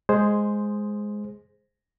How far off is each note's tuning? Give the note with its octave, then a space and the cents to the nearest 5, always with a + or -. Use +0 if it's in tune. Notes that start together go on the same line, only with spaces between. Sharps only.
G#3 +0 G#4 +0 C5 +0